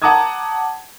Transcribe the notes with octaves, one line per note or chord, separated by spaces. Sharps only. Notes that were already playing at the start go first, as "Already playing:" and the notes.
F#5 A5 A#5 D6 D#6 G#6